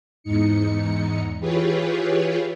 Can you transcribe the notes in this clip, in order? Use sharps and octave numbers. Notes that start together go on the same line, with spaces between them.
E2 G#2 D#4 C#7
E3 F4 G4 G#4 B4 C#5